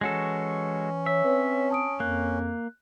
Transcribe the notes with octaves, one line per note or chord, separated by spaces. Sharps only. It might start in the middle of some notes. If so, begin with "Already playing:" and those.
E3 G#3 C#4 F#4 A4
C#5 E5
C4 B4 C#5
A5 D#6 D7
F2 A#3 F#6